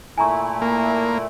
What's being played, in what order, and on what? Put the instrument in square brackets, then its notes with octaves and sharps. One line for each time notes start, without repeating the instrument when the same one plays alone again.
[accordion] A#2 A3 E4 [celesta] G#5 A#5 C#6
[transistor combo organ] A#3